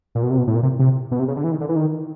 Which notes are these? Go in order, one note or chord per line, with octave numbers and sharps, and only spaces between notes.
A#2
B2
C3
B2
A2
A#2
C3
C3
B2
C3
C#3
D3
E3
D#3
D3
E3
D#3